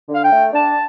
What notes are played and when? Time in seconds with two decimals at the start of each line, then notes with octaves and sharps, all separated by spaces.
0.09 D3
0.14 F5
0.24 G5
0.31 A3
0.53 D4 A5